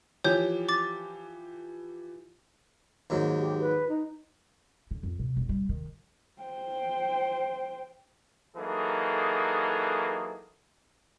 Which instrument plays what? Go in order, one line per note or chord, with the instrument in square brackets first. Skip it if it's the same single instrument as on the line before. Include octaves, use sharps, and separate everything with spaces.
[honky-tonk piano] E3 F3 G4 [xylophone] C#5 G6
[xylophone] D6 A6
[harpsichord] D#2 G#2 F#3
[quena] G4
B4
D#4
[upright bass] D3
F2
C3
E1
G3
D#3
[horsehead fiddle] C5 G5
[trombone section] E3 F#3 A#3 D#4 G#4 A4